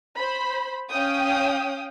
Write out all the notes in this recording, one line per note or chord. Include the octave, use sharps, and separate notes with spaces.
C5 B5
C#4 F5 G5 D#6